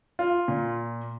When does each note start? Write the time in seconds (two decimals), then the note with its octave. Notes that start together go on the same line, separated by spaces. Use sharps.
0.19 F4
0.48 A#2